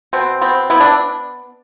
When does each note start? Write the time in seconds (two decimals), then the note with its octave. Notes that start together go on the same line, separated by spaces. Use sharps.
0.13 B2 C4
0.41 B3 C4
0.70 B3 E4
0.80 D4